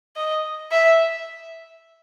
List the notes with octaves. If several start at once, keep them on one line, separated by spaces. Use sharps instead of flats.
D#5
E5